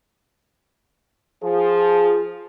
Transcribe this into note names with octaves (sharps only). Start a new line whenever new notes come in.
F3 G#4